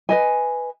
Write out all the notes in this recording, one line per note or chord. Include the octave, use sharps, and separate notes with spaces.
B4 D#5 G#5